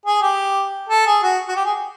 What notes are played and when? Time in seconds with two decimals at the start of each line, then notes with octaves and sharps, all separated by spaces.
0.06 G#4
0.22 G4
0.89 A4
1.06 G#4
1.23 F#4
1.48 F#4
1.56 G4
1.65 G#4